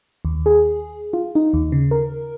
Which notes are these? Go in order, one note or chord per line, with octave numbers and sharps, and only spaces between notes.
D#2
G#4
F4
D#4
D#2
C#3
A#4